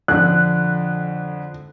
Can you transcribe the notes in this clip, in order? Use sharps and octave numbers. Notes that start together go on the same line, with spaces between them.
F2 D3 F#6